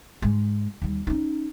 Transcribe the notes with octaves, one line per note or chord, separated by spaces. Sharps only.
G#2 G#3
D#2 G3
C#4 D#4